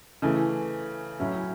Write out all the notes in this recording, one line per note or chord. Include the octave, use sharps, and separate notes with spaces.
C#3 E3 A3
A2 F#3 C#4 E4